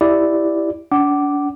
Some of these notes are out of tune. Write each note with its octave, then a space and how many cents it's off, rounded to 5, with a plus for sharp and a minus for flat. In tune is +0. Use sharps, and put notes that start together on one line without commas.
E4 +0 G4 +0 D5 +0
D4 -35 F#5 +30 D6 +0